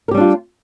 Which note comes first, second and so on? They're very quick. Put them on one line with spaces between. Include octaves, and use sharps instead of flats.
A#4 G4 G3 D4 F4